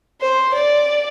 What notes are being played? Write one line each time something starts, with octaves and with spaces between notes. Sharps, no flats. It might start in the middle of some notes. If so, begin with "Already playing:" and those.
C5
D5